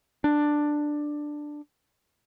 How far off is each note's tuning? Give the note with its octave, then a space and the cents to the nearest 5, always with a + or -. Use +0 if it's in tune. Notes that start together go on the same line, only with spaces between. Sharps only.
D4 +10